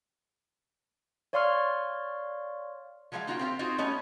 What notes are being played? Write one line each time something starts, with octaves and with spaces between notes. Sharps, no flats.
C#5 D5 F5 C6 C#6 F6
F3 F#3 G#3 C#5 F5 G5
A#3 D#4 F4 F#4 F5 G5
C4 F4 G4 C5 F5
C4 D#4 F4 F#4 G#4 C5
G3 A3 B3 C#4 C#5 D#5